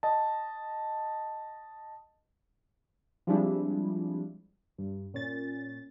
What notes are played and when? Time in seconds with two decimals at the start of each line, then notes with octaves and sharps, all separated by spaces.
0.03 D#5 A5
3.27 F3 G3 G#3 C4 D4 E4
4.78 G2
5.14 A#2 C#4 A6